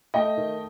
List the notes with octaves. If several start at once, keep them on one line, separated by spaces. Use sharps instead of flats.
A3 D#5 G5
D#3